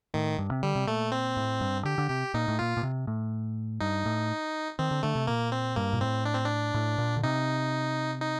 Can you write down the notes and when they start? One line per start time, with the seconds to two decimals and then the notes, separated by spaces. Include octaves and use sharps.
0.14 A2 D#3
0.38 G2
0.51 C3
0.63 D3 G3
0.76 C3
0.87 A#2 A3
1.12 C4
1.37 A2
1.61 G2
1.85 D3 G4
1.98 D3
2.10 C3 G4
2.34 A#2 D#4
2.48 A2
2.59 A#2 F4
2.77 A#2
2.83 C3
3.07 A2
3.80 G2 D#4
4.06 A2
4.79 D#3 C4
4.91 D3
5.03 D3 A3
5.15 C3
5.27 A#2 A#3
5.52 C4
5.76 G2 A#3
5.93 A#2
6.01 A2 C4
6.26 D4
6.35 C4
6.45 D4
6.74 A2
6.98 A#2
7.17 D3
7.23 C3 D#4
8.21 D#4